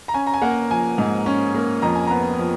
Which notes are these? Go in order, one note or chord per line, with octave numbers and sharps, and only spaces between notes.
A#5
C#4 G#5
A#5
G#5
A#3 F#5
F3 G#5
G#2
C#4
A#3
F2 A#5
G#5
B3 A#5
F3